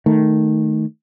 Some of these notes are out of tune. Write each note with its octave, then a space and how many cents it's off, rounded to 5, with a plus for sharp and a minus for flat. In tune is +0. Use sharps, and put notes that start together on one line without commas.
D#3 +0 A3 +0